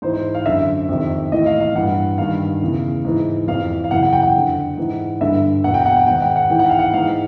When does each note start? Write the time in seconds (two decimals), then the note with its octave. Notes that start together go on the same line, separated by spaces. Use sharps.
0.02 G#2 E3 C5
0.13 C5
0.35 F5
0.45 F#2 D3 E5
0.89 F2 C3 D#3
1.32 A2 E3 D#5
1.46 F5
1.60 F5
1.74 G2 E3 F#5
2.18 G2 D#3 F5
2.62 E2 C#3 E3
3.05 G#2 E3
3.48 F2 C3 E3 F5
3.84 F5
3.91 F#2 C#3 E3 F#5
4.03 F#5
4.13 G5
4.23 F#5
4.35 F2 D3
4.77 G#2 E3
5.21 G2 D3 E5
5.64 E2 B2 F#5
5.74 G5
5.86 F#5
5.97 F#5
6.07 G#2 D#3 G5
6.22 F#5
6.36 F#5
6.50 G#2 E3 G5
6.59 F#5
6.70 F5
6.79 F#5
6.94 G#2 E3 F5